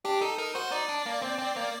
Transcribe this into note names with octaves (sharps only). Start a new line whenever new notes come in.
D4 G4
D#4 A4
D#4 A#4
F#4 C5
D#4 D5
D4
A#3
C4
C4
A#3